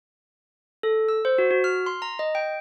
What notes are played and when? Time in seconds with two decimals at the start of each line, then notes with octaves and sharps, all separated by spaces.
0.83 A4
1.09 E6
1.25 C5
1.38 F#4
1.51 F#4
1.64 F6
1.86 C6
2.02 A#5
2.19 D#5
2.35 G5